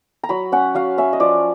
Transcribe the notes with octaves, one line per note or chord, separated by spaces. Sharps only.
A#5
F#3 B5
C#4 F#5
F#3 F5
C#4 E5
D#5
F3 D5